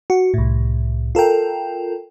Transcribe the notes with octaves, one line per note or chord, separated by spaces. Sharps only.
F#4
C2 A2
F4 A4 A#4 G5